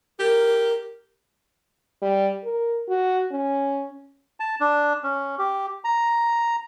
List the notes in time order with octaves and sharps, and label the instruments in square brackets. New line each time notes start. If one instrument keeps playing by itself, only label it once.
[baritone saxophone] G4 [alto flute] A#4
[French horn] G3
A#4
F#4
C#4
[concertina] A5
D4
C#4
G4
A#5